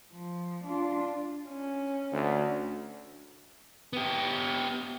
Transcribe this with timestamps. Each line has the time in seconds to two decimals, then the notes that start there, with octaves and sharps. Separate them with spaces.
0.12 F3
0.64 D4 F4
1.48 C#4
2.12 D2
3.93 B3 G4